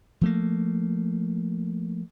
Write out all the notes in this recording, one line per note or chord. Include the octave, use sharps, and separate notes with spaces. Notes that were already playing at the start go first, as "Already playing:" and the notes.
F3 A3 A#3